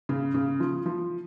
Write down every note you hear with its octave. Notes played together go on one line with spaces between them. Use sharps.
C#3
C#3
F3
F3